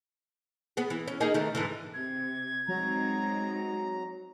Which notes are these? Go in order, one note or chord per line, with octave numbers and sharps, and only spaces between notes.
B3 G#4
E3
C#4
A#3 D#4 G#4
D#3 E3 A3
G#2 D3 E3
C3 G#6
F#3 G#3 C4 D#4 A#5